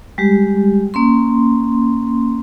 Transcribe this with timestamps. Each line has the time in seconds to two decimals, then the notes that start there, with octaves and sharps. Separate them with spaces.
0.18 G3 G#3 G4
0.94 A#3 C#4 C6